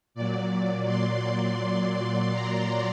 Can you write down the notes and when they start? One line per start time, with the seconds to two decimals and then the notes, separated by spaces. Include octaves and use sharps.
0.15 A#2 F#3 D5
0.87 C6
2.32 A#5